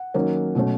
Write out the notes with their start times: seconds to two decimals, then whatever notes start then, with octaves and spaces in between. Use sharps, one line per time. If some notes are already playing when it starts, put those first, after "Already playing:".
Already playing: F#5
0.14 D#3 F#3 A#3 C#4
0.55 B2 F#3 A3 C#4